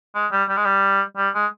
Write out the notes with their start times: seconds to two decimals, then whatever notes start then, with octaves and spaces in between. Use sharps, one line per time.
0.15 G#3
0.32 G3
0.49 G3
0.57 G#3
0.64 G3
1.17 G3
1.34 G#3